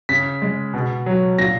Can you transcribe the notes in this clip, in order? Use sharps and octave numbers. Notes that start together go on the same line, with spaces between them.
C#3 B6
G#3
B2
F#3
A#2 A#6